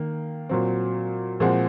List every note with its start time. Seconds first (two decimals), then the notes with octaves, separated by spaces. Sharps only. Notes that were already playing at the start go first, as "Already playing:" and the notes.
Already playing: D#3 A#3
0.49 A#2 F#3 C4
1.40 A#2 F3 G#3 C4 F#4